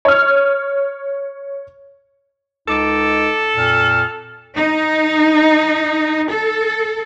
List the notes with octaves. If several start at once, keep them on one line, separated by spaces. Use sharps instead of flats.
C#5 F6
C#2 D#4 A4 D6
F2 A#2 F6
D#4
A4